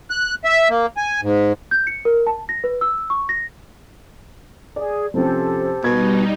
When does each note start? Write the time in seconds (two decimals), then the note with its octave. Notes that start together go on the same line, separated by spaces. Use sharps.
0.10 F#6
0.44 E5
0.69 A#3
0.97 G#5
1.22 G#2
1.71 G6
1.87 C#7
2.05 A#4
2.27 A5
2.49 A#6
2.64 B4
2.81 E6
3.10 C#6
3.29 A#6
4.76 G#4 D5
5.14 C3 F3 C#4 G4 A4 C5
5.84 B2 G3 D#4 G#6